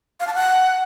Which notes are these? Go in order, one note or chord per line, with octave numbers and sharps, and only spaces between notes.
F5
A5
F#5